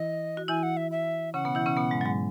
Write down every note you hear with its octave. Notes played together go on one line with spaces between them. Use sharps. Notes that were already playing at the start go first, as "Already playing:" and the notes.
Already playing: E3 E4 D#5
F#4
E3 E4 G#5
F#5
E5
E5
C#3 C#4 F#5
B2 B3
E3 E4
C#3 C#4
B2 B3
G#2 G#3
F#3
G#2 G#3